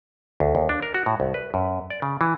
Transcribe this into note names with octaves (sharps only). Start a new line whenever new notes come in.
D2
D#2
D4
A#4
F#4
A2
C2
B4
F#2
D5
C#3
E3